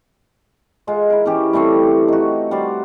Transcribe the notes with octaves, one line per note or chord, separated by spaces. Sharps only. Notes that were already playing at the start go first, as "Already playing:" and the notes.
G#3 F4 F#5
E4 A#4
E3 C#4 G4
G3 A3 C4 C#5
D#4 F#4
G3 F#4 C5 D5